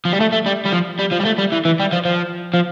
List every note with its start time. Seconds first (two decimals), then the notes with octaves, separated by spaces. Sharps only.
0.05 F3
0.13 G3
0.20 A3
0.32 A3
0.46 G3
0.66 G3
0.73 F3
1.00 G3
1.12 F3
1.21 G3
1.26 A3
1.39 G3
1.52 E3
1.65 E3
1.80 G3
1.92 F3
2.05 F3
2.54 F3